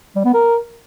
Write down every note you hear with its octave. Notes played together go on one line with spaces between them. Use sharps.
G3
B3
A#4